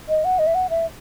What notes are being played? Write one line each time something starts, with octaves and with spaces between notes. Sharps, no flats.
D#5
F#5
D#5
E5
F#5
E5